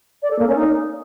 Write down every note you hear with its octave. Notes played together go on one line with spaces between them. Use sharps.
D5
A4
A#3
C#4
D#4